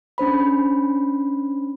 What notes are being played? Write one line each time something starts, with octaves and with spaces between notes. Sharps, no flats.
C#4 D4 C5 B5